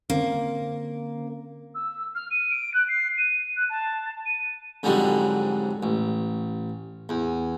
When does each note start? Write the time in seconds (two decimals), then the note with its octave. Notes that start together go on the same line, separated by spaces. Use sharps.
0.10 D3 A#3 C4 C#4
1.74 E6
2.15 F6
2.30 D#7
2.50 D7
2.74 F#6
2.88 C7
3.17 D#7
3.56 F#6
3.69 A5
4.25 D#7
4.83 F2 G#2 D3 F#3 G3
5.83 A1
7.09 E2